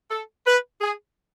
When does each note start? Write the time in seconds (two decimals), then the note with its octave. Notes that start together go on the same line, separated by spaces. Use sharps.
0.11 A4
0.46 B4
0.81 G#4